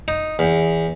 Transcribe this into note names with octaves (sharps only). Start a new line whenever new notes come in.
D#4
E2